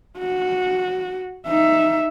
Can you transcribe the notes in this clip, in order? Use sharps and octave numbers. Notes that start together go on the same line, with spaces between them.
F#4
D#4 E5